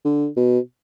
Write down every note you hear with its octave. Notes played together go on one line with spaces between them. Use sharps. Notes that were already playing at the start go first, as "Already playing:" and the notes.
D3
B2